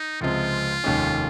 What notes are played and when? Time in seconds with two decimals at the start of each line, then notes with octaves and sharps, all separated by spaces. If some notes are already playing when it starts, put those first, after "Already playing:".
Already playing: D#4
0.21 C#2 C3 F3 G#3 C4 F4
0.84 F1 D#2 D#3 G#3 C#4